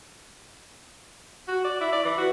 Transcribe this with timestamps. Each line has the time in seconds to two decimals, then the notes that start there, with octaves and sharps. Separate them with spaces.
1.48 F#4
1.64 D5
1.81 E4
1.93 D5
2.05 E3
2.18 F#4